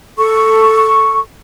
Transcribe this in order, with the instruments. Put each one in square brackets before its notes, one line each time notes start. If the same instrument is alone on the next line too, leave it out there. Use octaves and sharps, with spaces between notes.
[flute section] A4 C#6